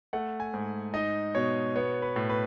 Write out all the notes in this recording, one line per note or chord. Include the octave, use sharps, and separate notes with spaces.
A3 F#5
G#5
G#2
D#4 D#5
B2 C#5
B3 C#5
B4
A2
B4